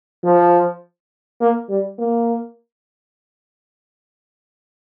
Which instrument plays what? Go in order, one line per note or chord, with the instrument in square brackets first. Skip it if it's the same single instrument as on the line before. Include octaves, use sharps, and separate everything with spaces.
[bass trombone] F3
A#3
G3
A#3